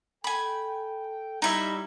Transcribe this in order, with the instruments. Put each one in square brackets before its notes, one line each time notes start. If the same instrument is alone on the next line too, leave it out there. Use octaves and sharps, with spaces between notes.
[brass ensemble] A4 G5 [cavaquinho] G#5 B5
[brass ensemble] G3 [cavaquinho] D#4 E4 E5